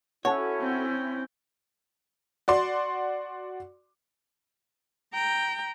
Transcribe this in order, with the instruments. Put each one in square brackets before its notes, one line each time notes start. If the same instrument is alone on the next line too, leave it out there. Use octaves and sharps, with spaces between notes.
[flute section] C#4 E4 [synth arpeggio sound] F#4 A4 F#5 [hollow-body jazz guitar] C#5
[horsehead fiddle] C4 G5
[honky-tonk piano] F#4 D5 C6
[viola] G5 A#5